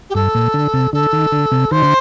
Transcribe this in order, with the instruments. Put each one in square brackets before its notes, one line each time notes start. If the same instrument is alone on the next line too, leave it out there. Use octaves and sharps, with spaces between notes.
[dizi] G4
[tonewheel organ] G2 [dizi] A4
[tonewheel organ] A#2
D3
C3
[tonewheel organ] D3 [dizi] A4
[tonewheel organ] D#3
D3
C3
[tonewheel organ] D#3 [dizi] C5
[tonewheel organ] D3